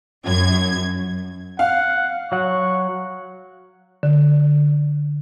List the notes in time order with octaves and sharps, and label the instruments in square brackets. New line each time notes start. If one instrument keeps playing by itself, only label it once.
[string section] F#2 G#6
[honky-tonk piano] F5 [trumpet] F#5
[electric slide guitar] F#3 F#5 [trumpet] C#6
[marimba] D3